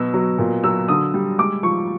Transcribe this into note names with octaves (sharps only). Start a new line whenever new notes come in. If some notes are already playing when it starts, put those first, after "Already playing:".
Already playing: B2 F#3 E6
F#3
A#2
F#3 E6
D3 D#6
G3
G#3 D6
F3 C#6